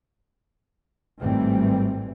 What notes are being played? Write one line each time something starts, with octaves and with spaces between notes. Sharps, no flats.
G#1 A2 E3 G3 A3 C4